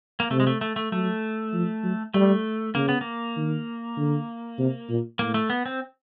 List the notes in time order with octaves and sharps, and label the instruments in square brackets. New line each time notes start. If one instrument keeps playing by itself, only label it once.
[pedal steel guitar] A#3
[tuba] C3 [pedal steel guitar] A3
[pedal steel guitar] G#3
A3
A3
A3
[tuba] F#3 [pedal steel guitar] A3
[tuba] F3
F#3
[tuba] G3 [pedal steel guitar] A3
[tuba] C#3 [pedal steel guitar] A#3
[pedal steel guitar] B3
A#3
[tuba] D#3
D3
C3
A#2
[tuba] A2 [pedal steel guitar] A#3
[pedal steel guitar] A3
B3
C4